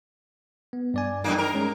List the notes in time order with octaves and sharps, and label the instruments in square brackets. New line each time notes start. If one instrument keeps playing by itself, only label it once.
[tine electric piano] B3
G2 D5 G#5
[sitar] F#2 A2 A#3 [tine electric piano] D#4
[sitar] A#4
[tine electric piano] G#3 C#4 D#4